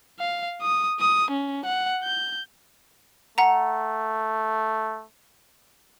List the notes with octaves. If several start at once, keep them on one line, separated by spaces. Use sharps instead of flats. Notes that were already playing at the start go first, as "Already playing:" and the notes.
F5
D#6
D#6
C#4
F#5
G6
A3 F#5 A#5